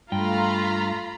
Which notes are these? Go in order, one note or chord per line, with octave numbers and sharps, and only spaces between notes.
G2 A3 F4 F5 G5 A#5 B5